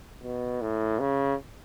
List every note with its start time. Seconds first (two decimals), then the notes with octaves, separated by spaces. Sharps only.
0.23 B2
0.61 A2
0.99 C#3